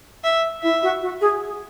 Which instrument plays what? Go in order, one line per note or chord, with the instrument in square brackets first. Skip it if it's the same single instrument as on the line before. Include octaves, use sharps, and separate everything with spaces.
[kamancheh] E5
[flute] E4 [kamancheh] E5
[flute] F#4
F#4
G#4